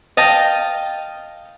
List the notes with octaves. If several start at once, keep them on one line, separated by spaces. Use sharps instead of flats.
D#5 F5 G5 A5